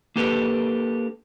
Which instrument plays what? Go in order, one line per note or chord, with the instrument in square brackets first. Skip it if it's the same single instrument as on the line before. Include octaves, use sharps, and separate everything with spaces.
[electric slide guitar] A#3 D4 G4 A4 B4